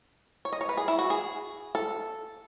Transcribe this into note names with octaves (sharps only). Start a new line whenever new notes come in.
C#5
D#5
C#5
B4
G#4
E4
F#4
G#4
A4